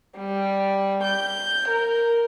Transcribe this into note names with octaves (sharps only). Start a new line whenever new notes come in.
G3
G6
A#4